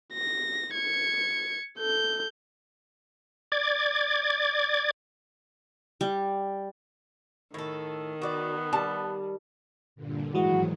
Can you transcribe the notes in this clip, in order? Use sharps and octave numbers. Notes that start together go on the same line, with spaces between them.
A#6
G#6 C#7
A4 G6
D5 D6 G#6
G3
A2 D#3 A4
B3 F#4 D5
G3 A5
G2 A#2 D3
G#2 D#3 E3 F#3 G#3 F#4